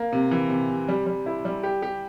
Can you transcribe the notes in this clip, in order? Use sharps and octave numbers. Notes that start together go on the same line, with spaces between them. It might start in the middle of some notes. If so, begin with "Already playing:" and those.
Already playing: A#3
C3
E3
C3
C3
G3
G3
E4
G3
G4
G4